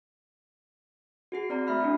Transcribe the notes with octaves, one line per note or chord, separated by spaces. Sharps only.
F#4 G#4 C7
C4 D5 A#5
A3 E5 B5 F6
D4 E4 F#4